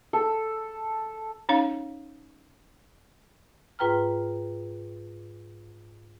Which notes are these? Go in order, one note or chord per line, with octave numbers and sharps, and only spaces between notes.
A4
C#4 D#4 C#5 F5
G#2 F4 B4 G5 A#5 F6